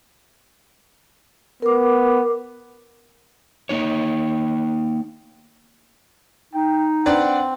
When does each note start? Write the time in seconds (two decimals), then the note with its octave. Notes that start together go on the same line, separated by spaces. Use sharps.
1.62 B3 A#4 D6
3.69 A#3 D#4 C#5
6.53 D#4 G5
7.06 C4 D4 B4 D5 F#5